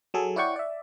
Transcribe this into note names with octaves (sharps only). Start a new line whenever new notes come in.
F#3 G#4 A4
E4 C#5 D5 F#5 G5 C#6
D5 E5